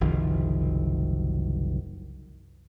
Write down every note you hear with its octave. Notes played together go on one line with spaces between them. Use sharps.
F#1 C2 D#3 F3